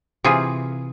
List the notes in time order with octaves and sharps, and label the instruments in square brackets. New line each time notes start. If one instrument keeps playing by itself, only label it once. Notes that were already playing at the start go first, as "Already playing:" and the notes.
[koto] C3 E3 F4 G#4